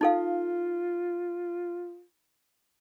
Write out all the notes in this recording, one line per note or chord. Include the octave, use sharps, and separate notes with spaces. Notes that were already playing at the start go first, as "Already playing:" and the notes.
D#4 F4 A4 F5